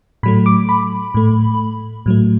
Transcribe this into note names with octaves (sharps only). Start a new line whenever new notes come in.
A2 F#3 A3 B5
D6
B5
A2 A3
A2 F#3 A3